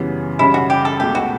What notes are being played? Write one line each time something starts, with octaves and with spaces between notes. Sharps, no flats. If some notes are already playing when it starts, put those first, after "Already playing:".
Already playing: F#2 C#3 E3 G3 B3
F#2 C#3 G3 E4
F#4
G4
A4
C#2 B2 A3 G4
F#4